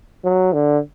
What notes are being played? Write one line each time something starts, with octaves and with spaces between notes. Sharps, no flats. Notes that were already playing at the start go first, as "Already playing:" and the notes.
F#3
D3